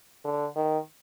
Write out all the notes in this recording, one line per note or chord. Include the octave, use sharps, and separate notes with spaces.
D3
D#3